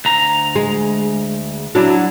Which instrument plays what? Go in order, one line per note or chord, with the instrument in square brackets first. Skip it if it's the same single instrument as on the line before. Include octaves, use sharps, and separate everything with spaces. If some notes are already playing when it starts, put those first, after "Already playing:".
[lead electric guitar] D2 A#5
[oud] G#3
F#3 D4 E4